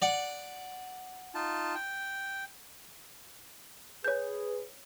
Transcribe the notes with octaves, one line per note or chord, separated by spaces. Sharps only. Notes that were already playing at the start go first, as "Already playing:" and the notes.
D5 F#5
D#4 F4 A5
G5
G#4 B4 C#5 G6